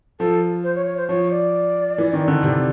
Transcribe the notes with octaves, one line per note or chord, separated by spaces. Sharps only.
F3 A4
C5
C#5
C#5
C5
F3 C#5
D5
E3
D#3
D3
C3 D5